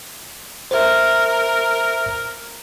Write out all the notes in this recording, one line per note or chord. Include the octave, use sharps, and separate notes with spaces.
A#4 C5 E5